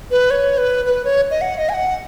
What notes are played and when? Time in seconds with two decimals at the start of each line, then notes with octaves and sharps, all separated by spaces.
0.11 B4
0.30 C#5
0.58 B4
0.86 B4
1.05 C#5
1.31 D#5
1.41 F#5
1.58 D#5
1.69 G#5
1.74 F#5